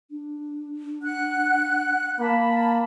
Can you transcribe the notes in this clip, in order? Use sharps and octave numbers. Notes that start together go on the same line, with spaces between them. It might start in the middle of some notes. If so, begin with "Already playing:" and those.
D4
F#5 F#6
A#3 A5 B5